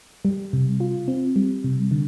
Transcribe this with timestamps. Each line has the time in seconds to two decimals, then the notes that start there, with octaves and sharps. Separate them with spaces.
0.25 G3
0.53 C3
0.80 F4
1.08 C4
1.36 G3
1.64 C3
1.91 D3